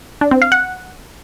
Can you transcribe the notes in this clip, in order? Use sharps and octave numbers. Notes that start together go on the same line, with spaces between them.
D4
C4
F5
F#5